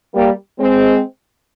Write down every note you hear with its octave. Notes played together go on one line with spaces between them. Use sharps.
G3 A#3
G#3 C4